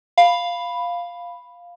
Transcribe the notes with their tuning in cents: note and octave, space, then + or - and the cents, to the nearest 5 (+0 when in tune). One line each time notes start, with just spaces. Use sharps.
F5 +0 B5 +0